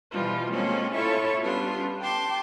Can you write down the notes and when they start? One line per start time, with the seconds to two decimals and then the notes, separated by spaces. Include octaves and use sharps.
0.12 B2 E3 F3 G3 F4
0.50 G#3 A#3 C4 C#4 F4 A4
0.95 E4 F4 A4 C#5 E5 C#6
1.41 G3 B3 C#4 D4 F4
2.00 G5 A5 C6 D6